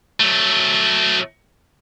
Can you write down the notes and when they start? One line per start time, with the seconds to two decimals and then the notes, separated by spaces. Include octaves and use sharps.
0.20 F#3 A3